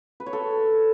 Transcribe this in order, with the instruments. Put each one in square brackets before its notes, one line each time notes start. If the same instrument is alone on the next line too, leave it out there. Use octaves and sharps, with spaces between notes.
[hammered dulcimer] B4
C#5
A4